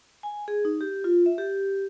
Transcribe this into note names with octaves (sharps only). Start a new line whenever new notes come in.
G#5
G#4
D#4
G4
F4
E5
G4